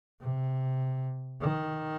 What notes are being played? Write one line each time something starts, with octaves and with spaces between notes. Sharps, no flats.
C3
D#3